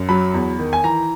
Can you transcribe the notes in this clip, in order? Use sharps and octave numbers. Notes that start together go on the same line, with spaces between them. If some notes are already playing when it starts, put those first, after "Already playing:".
Already playing: F#2
F#3 B5
E2
D#3
G#5
E3 A#5